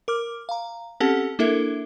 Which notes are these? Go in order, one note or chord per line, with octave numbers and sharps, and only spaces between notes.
A#4 D6 F6
F5 A#5
C4 C#4 G4 A4 F#5 A5
A#3 D4 E4 A4 A#4 E5